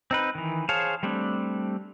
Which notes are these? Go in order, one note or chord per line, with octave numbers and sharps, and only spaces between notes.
C4 D#4 B4
D#3 E3
G#4 C5 C#5 F5 A5
G3 A3 C4 D4